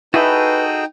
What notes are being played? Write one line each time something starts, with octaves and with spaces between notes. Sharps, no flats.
D#4 E4 F#4 G#4 A4 B4 G5